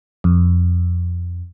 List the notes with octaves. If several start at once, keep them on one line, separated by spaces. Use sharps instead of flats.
F2